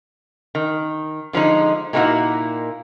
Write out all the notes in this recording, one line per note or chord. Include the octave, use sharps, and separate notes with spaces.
D#3
D3 F3 G#3 D#4
A#2 G#3 A#3 D#4 E4 F#4